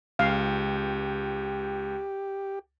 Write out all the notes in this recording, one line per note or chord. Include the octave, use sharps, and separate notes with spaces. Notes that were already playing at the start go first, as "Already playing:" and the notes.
C#2 G4 F5